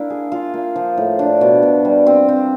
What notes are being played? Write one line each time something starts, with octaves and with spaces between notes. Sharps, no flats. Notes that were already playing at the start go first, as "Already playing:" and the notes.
Already playing: A#3 D4 E4
G#4
F4
A#3
F3
A2
D4
B2
B2
G3
C4
C4